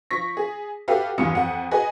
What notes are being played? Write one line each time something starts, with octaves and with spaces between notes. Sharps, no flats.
F3 C#6 A#6 B6
G#4
F#4 G4 A4 B4 E5 F5
E2 G2 E3 F4 D#6 C#7
F2 F#5
F#4 G#4 B4 D#5 G#5